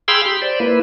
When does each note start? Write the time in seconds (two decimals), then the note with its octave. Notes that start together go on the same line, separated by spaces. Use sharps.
0.08 G#4 F5 G5 B5 C6 E6
0.26 G4
0.42 C5 D5
0.60 A#3 E4 B4